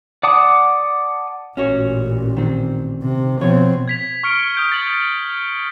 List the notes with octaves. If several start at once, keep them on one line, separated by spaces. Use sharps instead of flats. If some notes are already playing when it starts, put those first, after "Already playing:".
D5 F#5 A5 D6 D#6
A1 A#2 C#4 F#4 C#5
D#3 C4
C3
B2 F3 C4 C#5
G#6 B6 F7
C#6 F6 C#7 D7 F7 G7
D#6 G6 D7
A6 F#7